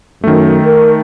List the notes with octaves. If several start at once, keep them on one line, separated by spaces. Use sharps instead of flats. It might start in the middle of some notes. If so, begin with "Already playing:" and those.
F#2 D#3 A3
A#4